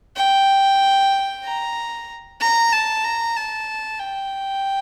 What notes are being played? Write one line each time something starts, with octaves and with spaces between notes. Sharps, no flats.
G5
A#5
A#5
A5
A#5
A5
G5